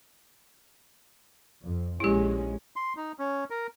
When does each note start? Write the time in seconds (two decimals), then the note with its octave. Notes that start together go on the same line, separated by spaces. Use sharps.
1.62 F2
2.00 A#1 G#3 C#4 E4 G4
2.76 C6
2.97 D#4
3.19 C#4
3.50 A#4